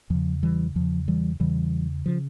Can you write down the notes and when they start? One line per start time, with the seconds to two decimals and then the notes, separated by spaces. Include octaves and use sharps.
0.10 E2 C#3 F3
0.43 E3 G3
0.75 E2 C#3 F3
1.08 E3 G3
1.40 E2 C#3 E3 G3
2.06 C#3 F3